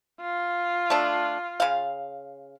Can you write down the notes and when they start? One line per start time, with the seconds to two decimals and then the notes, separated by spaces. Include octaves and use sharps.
0.21 F4
0.90 A3 D4
1.60 C#3 F5